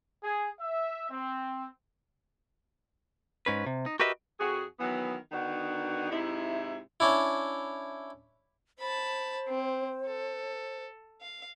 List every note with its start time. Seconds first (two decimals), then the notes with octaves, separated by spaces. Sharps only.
0.23 G#4
0.59 E5
1.10 C4
3.46 G#2 C#4 B4
3.66 C3
3.86 D#4
4.00 F#4 G4 A#4 B4 D#5 E5
4.40 F2 F#4 G#4
4.80 D#3 E3 F#3 B3
5.32 D3 D#3 B3 D4 D#4 F#4
6.11 G#2 C3 D#4 E4
7.00 C#4 D4 E4
8.79 C5 A5 B5
9.47 C4
10.06 A4
11.21 F5